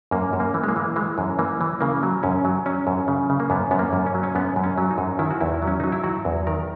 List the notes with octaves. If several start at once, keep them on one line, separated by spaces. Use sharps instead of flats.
F#2 A#3
F#2
A#3
E3
G#3
A#3
E3
E3 G#3
F#2
E3 A#3
E3
C#3 A#3
F#3
F#2 C#4
F#3
F#3 C#4
F#2
C#3
C#3
A#3
F#2 B3
F#2 B3
A#3
F#2
C#4
F#3
C#4
F#2 B3
F#2
C#4
F#3
D#4
F#2
D#3 E4
F#4
E2 E4
F#3
C#4
F#3 D#4
E4
F#3 F#4
E2
D#3 A#4